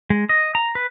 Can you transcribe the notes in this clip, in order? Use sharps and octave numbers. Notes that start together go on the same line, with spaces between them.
G#3
D#5
A#5
B4